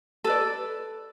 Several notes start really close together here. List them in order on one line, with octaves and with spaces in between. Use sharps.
A4 B4 D5